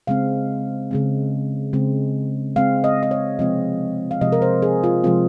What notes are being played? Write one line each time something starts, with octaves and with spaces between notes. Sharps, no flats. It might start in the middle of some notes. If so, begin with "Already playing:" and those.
C#3 G#3 C4 F5
C#3 G#3 C4
C#3 G#3 C4
C#3 G#3 C4 F5
D#5
D#5
C#5
C3 F3 G#3 C4 D#5
F5
C3 F3 G#3 C4 D#5
A#4
C5
G#4
F4
C3 F3 G#3 C4 F4